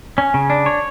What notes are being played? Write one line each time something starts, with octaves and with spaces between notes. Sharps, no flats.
C#4
C#3
D4
C#5